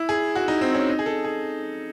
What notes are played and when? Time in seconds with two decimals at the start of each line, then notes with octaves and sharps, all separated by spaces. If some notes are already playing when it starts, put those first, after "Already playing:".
Already playing: E4
0.09 G#4
0.35 F#4
0.48 D#4
0.61 C4
0.75 C#4
0.89 D#4
0.99 G#4
1.06 A4
1.24 G#4